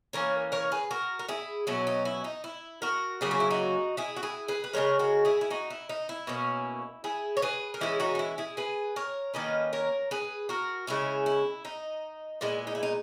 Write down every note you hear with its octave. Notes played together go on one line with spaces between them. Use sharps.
E3 A#3 C#4 A#4 C#5
A#4 C#5
G#4 B4
F#4 A#4
A#4
E4 G#4
B2 F#3 C#4 E4
D#4
E4
D#4
E4
F#4 A#4
C#3 F#3 A#3 C#4 G#4
F#4
E4
D#4 F#4
E4 G#4
F#4
E4 G#4
G#4 B4
B4
C#3 E3 G#3 A#4 C#5
F#4 A#4
E4 G#4
E4
D#4 F#4
E4
D#4
E4
B2 A#3 C#4
E4 G#4
C#5
G#4 B4
A#4
E3 G#3 C#4 E4 G#4
D#4 F#4
D#4
E4
E4 G#4
G#4 B4
A#4 C#5
D#3 A#3 C#4 B4 D#5
A#4 C#5
G#4 B4
F#4 A#4
C#3 G#3 C#4 E4
E4
D#4
A#2 G#3 B3 E4
D#4
E4
D#4